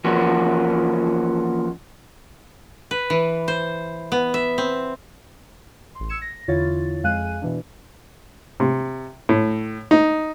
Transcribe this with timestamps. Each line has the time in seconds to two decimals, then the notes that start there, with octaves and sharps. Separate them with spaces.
0.04 E3 F3 A#3 C#4 F#4
2.91 B4
3.10 E3
3.48 C5
4.12 B3
4.34 E5
4.58 C4
5.95 A1 C6
6.09 E6 G#6 C#7 E7
6.22 A#6
6.48 E2 D3 E4 F4 C#5 A6
7.03 F2 G#3 F5 G#5 F#6 D#7
7.42 B2 E3 D4
8.60 C3
9.29 A2
9.91 D#4